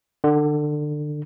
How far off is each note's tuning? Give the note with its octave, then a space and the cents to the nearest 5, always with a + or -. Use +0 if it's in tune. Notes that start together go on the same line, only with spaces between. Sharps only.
D3 +25